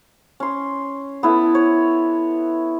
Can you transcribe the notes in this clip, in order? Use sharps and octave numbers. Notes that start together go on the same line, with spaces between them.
C#4 C6
B3 E4 A4
C#5